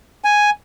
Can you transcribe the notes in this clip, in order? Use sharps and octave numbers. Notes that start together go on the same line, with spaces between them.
G#5